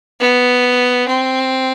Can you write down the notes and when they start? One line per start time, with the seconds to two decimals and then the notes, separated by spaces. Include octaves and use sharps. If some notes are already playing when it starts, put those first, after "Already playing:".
0.20 B3
1.08 C4